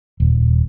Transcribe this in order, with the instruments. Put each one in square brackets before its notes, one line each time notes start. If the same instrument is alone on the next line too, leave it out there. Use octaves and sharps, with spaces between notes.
[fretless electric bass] D#1